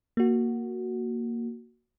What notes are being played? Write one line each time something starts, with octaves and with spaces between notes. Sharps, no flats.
A#3 F#4